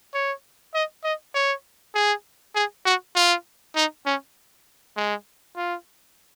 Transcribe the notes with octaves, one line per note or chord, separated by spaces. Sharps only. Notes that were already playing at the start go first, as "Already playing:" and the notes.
C#5
D#5
D#5
C#5
G#4
G#4
F#4
F4
D#4
C#4
G#3
F4